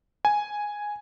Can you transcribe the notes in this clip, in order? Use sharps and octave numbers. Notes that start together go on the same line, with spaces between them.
G#5